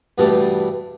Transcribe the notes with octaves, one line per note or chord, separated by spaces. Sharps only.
G2 B2 E3 G3 A3